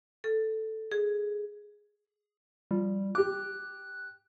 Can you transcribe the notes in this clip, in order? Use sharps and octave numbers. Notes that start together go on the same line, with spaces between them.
A4
G#4
F3 G3
G4 D6 F#6